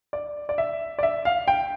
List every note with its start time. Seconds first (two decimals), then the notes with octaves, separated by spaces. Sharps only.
0.13 D5
0.49 D5
0.58 E5
0.99 D5
1.03 E5
1.25 F5
1.48 G5